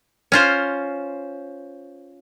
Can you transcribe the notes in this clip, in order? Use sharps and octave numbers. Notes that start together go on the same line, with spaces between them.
C#4 F4 C5